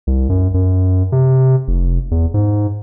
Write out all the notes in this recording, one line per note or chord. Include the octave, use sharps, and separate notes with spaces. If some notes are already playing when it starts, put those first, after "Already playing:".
C2
F#2
F#2
C3
F1
E2
G#2